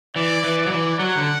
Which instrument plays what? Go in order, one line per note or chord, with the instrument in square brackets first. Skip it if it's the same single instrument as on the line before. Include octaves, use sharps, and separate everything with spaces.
[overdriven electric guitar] E3 [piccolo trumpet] D5
[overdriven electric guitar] E3
[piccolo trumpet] D5
[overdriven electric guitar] F#3
E3
[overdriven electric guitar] F#3 [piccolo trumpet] F#5
[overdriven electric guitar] D3